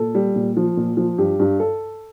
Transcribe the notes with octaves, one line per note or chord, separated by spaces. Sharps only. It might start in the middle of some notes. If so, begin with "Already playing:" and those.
Already playing: A#2 A4
G3
A#2
F3
A#2
F3
G2 G4
G2
A4